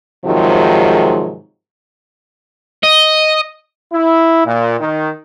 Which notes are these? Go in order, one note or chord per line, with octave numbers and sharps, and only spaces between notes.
G#2 C3 D#3 F3 F#3 G#3
D#5
E4
A#2
D#3